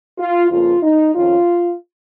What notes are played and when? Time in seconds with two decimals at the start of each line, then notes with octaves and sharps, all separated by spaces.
0.18 F4
0.50 F2 C#3 A#3 F4
0.83 D#4
1.15 F2 D#3 C#4 F4